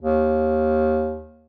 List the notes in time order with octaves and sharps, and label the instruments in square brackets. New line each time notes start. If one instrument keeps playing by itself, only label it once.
[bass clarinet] D#2